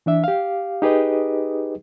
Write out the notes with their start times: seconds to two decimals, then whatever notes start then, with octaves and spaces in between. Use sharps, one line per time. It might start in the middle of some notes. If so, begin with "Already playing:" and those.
0.06 E3 D4 E5
0.24 G4 F5
0.82 D#4 G4 G#4 B4 D#5